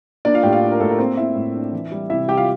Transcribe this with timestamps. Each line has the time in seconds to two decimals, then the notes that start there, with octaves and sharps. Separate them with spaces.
0.25 A#3 D4 D5
0.34 F4 F5
0.43 A2 G4 G5
0.52 F4 F5
0.62 D4
0.72 A#4
0.80 A2 A4
0.90 A#4
0.98 A#3 C4 C5
1.17 A#3 E4 E5
1.35 A2
1.54 D4
1.72 E3
1.92 G3
2.10 C3 E4 E5
2.28 G3 G4 G5
2.37 F4 F5